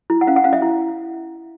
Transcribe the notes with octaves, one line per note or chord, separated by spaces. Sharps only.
E4
F#5
C#4 F5
F#5
C#4 F5
E5
E4